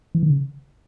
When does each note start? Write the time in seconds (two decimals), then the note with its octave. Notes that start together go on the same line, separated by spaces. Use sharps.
0.15 E3
0.23 D#3
0.30 C#3